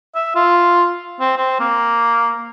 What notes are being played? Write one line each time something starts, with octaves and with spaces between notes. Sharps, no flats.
E5
F4
C4
C4
A#3